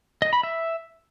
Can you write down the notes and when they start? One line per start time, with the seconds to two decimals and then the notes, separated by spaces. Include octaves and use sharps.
0.22 D#5
0.33 B5
0.43 E5